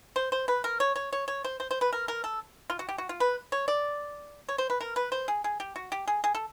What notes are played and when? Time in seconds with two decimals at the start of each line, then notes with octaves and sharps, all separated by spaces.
0.16 C5
0.32 C5
0.48 B4
0.64 A#4
0.80 C#5
0.96 C#5
1.13 C#5
1.28 C#5
1.44 C5
1.60 C5
1.71 C5
1.81 B4
1.93 A#4
2.08 A#4
2.24 A4
2.70 F4
2.79 F#4
2.89 G4
2.98 F#4
3.09 F4
3.20 B4
3.52 C#5
3.68 D5
4.49 C#5
4.58 C5
4.70 B4
4.81 A#4
4.96 B4
5.12 C5
5.28 G#4
5.44 G#4
5.60 G4
5.76 F#4
5.92 G4
6.07 G#4
6.24 G#4
6.35 A4